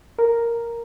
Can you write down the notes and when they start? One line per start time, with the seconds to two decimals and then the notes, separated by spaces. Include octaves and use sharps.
0.19 A#4